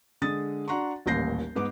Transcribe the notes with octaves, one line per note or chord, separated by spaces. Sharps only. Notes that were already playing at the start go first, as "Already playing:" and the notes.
D3 G#3 D#6 A6
D4 F#4 F#5 A#5 C6 C#6
D#1 A1 D#2 G6 A#6 C7
G#2 B3 D6